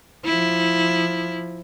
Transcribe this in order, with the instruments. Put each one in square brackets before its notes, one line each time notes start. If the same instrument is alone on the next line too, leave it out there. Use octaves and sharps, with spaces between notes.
[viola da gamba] F3 E4